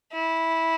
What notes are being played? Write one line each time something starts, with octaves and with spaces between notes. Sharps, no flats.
E4